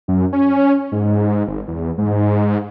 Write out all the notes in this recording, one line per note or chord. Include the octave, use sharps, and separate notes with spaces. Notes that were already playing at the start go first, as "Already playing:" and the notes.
F#2
C#4
G#2
G#1
E2
G#2